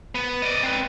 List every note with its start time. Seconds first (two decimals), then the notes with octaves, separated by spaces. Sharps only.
0.15 B3
0.42 D5 D#5
0.63 C4 B4